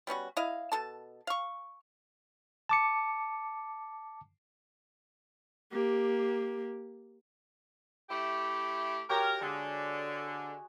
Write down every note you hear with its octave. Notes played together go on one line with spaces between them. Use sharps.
G3 B3 C#4 F#4
E4 D#5 F5
B2 A4 A5
F5 C#6
A5 D6 C#7
A#3 G4
A3 E4 G4
F#4 G4 A#4 C#5
D3 G#3 G#4